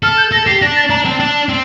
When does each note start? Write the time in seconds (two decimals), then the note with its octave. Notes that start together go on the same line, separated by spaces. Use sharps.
0.03 A4 F6
0.17 G6
0.32 A4 A#6
0.47 G4 C7
0.61 D4 A#6
0.76 A6
0.90 D4 A#5
1.05 C4 A5
1.20 D4
1.49 C4